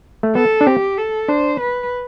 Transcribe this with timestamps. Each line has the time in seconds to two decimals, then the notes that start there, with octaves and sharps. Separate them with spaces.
0.23 A3
0.35 B3 A4
0.61 D4
0.66 C4 G4
0.98 A4
1.28 D4 C5
1.60 B4